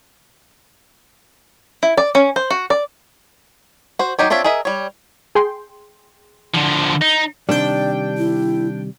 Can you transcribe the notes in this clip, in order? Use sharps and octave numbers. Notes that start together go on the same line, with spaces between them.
E4
D5
C#4
C5
F#4
D5
F#4 C5
F#3 D#4 G4 C#5
C4 D4 F4 C#5 E5
G#4 A#4 D#5 E5
G3 C#5
G#4 G5 C6
D3 F3
D#4
C3 D#3 G3 D4 D5 G5
E4